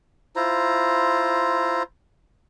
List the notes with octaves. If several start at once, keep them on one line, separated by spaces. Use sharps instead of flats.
E4 F4 C5 A#5